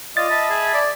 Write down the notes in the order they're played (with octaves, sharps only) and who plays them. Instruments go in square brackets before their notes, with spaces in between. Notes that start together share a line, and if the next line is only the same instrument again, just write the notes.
[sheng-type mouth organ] F4 D5 F5 [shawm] D#5 [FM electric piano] A6
[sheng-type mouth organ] E5 A5 B5
[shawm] G#4
D5